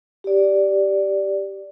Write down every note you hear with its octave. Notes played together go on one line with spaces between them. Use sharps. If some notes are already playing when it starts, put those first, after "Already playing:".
G4 D5